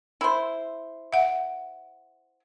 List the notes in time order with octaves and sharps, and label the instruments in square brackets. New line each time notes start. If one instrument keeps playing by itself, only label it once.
[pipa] E4 C5
[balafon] E5 F#5